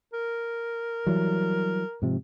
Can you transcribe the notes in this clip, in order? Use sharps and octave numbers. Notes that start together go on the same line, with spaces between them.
A#4
E3 F#3 G3
G#2 C3 F3